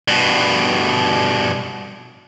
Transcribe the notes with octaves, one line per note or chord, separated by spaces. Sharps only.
G2 B2